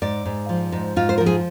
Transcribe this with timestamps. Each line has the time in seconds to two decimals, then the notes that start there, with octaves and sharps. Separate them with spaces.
0.02 G#2 D5
0.25 G#2
0.49 F3
0.72 G#2
0.96 G#2 F4
1.09 C5
1.18 F3 A#4
1.26 G#4